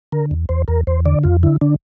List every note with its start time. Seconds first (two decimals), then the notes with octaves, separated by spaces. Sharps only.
0.12 D3 A#4
0.31 E2
0.49 E2 C5
0.68 E2 A#4
0.87 E2 C5
1.05 D3 D5
1.24 F2 F4
1.43 D3 E4
1.61 D3 D4